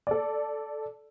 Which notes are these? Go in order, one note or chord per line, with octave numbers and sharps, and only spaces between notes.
A4 D5